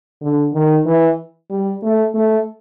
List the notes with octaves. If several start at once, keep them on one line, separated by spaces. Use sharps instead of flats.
D3
D#3
E3
G3
A3
A3